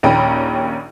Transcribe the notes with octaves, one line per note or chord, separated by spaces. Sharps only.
A#1 D#2 C#4 G5 A#5 B5